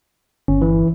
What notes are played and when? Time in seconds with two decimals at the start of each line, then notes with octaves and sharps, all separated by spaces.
0.48 G1 C#4
0.61 E3